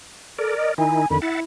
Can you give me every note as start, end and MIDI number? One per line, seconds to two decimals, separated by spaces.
0.39 0.56 69
0.39 0.74 70
0.39 0.74 74
0.57 0.71 75
0.78 1.06 51
0.78 1.06 63
0.78 1.06 64
0.78 1.07 80
1.10 1.20 41
1.10 1.20 50
1.10 1.20 51
1.10 1.17 83
1.22 1.44 64
1.22 1.40 76
1.22 1.40 78
1.22 1.40 93